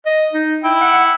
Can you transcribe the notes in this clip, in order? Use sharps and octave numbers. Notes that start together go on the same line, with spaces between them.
D#5
D#4
E4 G5
F#5